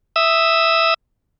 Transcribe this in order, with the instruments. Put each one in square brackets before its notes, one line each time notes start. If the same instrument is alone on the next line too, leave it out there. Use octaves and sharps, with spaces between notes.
[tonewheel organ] E5 D#6 E6